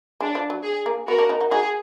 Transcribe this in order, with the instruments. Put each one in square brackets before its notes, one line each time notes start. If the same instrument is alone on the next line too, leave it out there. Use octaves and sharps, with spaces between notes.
[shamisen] G#3 [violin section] D4
[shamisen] F3
F#3
[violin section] G#4
[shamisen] A#3
[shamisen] B3 [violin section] F#4 A#4
[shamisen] A#3 D4
B3 D#4
D#4 F#4
[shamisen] D#4 F#4 [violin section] G#4